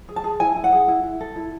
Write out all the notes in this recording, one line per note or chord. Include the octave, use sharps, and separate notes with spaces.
G#4
A5
G#4
E4 G#5
E4
F#5
G#4
E4
E4
A4
E4